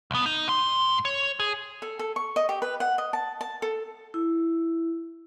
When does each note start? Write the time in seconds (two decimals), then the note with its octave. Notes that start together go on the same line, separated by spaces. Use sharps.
0.11 C2 B3
0.26 D#4
0.48 G#2 C6
1.05 C#5
1.40 G#4
1.82 A4
1.99 A4
2.16 C#6
2.36 D#5
2.49 G4
2.62 B4
2.80 F#5
2.98 D#5
3.13 A5
3.41 A5
3.62 A4
4.14 E4